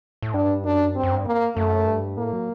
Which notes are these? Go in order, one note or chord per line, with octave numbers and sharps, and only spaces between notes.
A2
G2 D4
F#2 D4
G2 C4
F#2
G2
A#3
F#2 A3
G2
A2 A#3
F#3